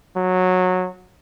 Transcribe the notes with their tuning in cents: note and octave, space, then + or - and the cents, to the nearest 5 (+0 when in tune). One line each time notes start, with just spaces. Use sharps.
F#3 -15